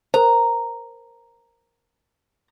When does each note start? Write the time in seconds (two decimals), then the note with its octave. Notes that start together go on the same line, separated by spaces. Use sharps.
0.14 A#4 C5 A#5